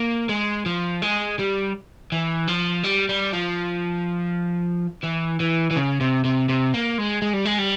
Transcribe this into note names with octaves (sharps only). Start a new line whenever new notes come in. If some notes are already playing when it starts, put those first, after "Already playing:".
Already playing: A#3
G#3
F3
G#3
G3
E3
F3
G3
G3
F3
E3
E3
E3
C#3
C3
C3
C3
A#3
G#3
G#3
G3
G#3
G3